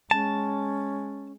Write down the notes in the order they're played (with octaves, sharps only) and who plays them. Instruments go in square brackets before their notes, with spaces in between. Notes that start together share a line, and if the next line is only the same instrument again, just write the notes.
[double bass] G#3 [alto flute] C#4 [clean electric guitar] A5